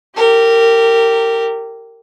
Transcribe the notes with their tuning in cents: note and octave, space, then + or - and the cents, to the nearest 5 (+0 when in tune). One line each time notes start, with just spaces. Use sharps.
G4 -10 A#4 -25